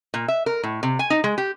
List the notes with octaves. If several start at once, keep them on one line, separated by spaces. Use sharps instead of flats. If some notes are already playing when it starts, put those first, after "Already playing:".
A#2
E5
A#4
A2
C3
G#5
D#4
G#3
G4